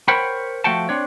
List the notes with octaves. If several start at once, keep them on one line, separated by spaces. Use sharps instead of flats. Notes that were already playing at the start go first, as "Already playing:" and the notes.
A#4 C5 C#5 F#5 G5 B5
F3 A3 F#4 F#5 G5 A5
C4 D4 C#5